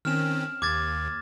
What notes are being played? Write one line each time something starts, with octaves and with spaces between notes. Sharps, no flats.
D#3 C4 C#4 F6 E7
D#2 D6 G#6 A6